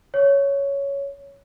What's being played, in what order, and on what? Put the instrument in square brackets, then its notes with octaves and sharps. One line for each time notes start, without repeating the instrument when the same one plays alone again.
[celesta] C#5